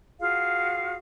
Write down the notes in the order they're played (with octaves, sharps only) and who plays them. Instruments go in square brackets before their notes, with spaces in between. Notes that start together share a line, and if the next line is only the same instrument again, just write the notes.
[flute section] F4 F#4 G#4 F5